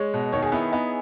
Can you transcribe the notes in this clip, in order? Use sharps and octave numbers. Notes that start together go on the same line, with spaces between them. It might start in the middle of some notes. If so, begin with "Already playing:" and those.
Already playing: G#3 C#5
B2
D#3 C#5
G#4
B3 E4
B3 D#4